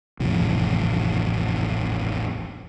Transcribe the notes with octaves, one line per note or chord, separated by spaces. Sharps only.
D#1 A1 F2 C3